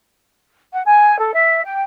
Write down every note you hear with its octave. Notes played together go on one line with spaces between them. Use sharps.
F#5
G#5
A4
E5
G5